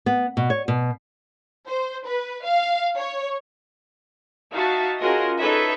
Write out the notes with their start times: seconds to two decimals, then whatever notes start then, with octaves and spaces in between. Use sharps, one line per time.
0.06 B3
0.37 B2
0.50 C#5
0.68 B2
1.67 C5
2.06 B4
2.44 F5
2.97 C#5
4.53 D#4 F#4 E5 F5 A5
5.00 C#4 F4 F#4 G#4 A#4 D#5
5.38 D#4 A4 B4 C#5 E5